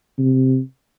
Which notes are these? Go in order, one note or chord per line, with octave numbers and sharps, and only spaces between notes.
C3